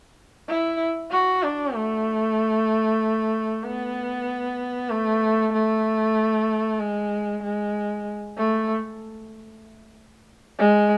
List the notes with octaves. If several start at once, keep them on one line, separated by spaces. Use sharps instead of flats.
E4
F#4
D4
A3
B3
A3
A3
G#3
G#3
A3
G#3